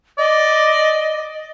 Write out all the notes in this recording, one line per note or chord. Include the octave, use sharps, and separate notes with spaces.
D5 D#5